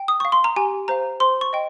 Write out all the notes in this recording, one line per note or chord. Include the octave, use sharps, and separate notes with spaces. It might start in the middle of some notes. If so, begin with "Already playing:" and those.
Already playing: G5
D#6
F5 C#6
C6
A#5
G4 G#5
C5 F5 A#5
C5 C6
C#6
D#5 G5